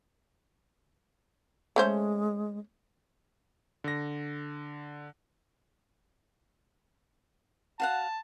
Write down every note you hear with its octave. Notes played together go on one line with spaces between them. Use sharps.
G#3 A3 C#4 C5
D3 A#6
F#4 F5 F#5 A5